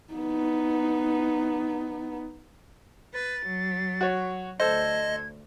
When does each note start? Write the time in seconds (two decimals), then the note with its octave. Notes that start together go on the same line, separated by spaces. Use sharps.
0.13 B3 D#4
3.14 B4 A6
3.46 F#3
4.01 F#4 C#5
4.60 D2 A4 C5 D#5 G#6